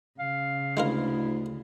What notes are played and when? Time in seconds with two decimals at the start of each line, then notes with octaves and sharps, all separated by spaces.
0.19 C#3 F5
0.77 D2 G#3 E4 F4 A#4